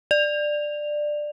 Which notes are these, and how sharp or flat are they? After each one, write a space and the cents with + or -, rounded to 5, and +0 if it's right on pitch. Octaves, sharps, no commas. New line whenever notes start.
D5 +15